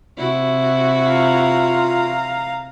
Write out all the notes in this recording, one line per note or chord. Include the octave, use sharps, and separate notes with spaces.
C3 E4 F#4
F4 F5 A#5